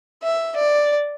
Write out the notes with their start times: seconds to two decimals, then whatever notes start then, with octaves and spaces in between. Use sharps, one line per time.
0.23 E5
0.56 D5